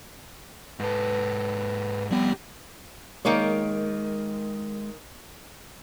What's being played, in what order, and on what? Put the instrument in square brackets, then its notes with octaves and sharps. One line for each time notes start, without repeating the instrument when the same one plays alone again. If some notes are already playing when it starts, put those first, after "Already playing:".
[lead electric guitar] G#2 A4 [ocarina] B4
[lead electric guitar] F2 G4 [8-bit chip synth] G3 B3
[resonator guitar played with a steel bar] D#3 A#3 C#5 [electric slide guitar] G#3